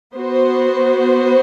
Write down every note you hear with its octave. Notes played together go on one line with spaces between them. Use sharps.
B3 F#4 C5